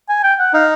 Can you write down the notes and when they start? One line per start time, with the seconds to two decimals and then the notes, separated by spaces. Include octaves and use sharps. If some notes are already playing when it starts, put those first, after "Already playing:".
0.09 G#5
0.23 G5
0.39 F#5
0.53 D#4 F5